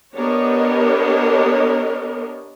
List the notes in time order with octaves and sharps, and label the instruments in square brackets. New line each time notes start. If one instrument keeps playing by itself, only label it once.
[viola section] B3 D4 G4 A#4 C#5 D#5